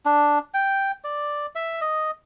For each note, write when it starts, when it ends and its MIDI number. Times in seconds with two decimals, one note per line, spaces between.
0.05 0.39 62
0.54 0.91 79
1.04 1.46 74
1.55 1.81 76
1.81 2.11 75